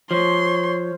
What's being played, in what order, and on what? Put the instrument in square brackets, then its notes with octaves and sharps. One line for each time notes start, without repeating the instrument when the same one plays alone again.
[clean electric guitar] F3 [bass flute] C5 [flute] C#5 [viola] C6